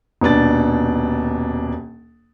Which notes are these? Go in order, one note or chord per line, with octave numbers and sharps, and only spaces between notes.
D#1 B2 D4 A6